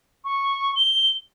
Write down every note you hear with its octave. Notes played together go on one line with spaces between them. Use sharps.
C#6
G7